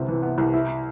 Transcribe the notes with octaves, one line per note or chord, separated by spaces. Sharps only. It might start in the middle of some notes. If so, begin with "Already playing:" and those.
Already playing: C2 C3 B3
E3
B3
C2
E4